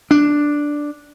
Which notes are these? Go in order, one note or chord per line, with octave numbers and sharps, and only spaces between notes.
D4